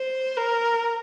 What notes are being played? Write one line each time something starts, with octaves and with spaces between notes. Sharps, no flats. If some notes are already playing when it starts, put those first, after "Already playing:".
Already playing: C5
A#4